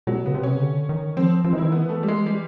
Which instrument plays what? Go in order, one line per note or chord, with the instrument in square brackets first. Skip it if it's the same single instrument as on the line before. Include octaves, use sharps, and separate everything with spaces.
[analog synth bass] B2 [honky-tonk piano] F#3
[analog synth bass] C#3 [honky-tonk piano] B3
[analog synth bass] C3
[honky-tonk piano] C#4
[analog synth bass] C#3
D3
D#3
[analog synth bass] F3 [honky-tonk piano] C4
[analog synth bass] F3 [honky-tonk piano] C4
[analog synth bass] E3 [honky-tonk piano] D#4
[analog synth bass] D#3 [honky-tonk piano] E4
[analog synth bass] E3 [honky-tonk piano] B3
[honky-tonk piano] A3
G3
G#3
G3